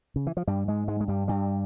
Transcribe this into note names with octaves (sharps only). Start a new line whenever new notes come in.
C#3
E3
F3
G2 G3
G#2 G#3
G#2 G#3
G#3
G2 G3
G2 G3